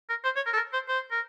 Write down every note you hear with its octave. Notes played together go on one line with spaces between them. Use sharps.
A#4
C5
C#5
A#4
A4
A#4
C5
C5
A#4